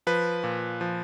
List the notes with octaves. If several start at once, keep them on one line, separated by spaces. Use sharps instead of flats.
F3 B4
A#2
F3